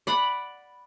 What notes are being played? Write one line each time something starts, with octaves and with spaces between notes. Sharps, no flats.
D5 F#5 B5